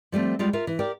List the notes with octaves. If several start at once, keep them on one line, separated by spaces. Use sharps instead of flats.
F3 G3 A3 C4
G3 G#3 F4 G4
F4 A#4 E5
E3
G4 A#4 D5 G5